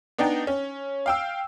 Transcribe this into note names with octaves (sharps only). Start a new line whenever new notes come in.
B3 D4 D#4 G5
C#4
F5 G5 E6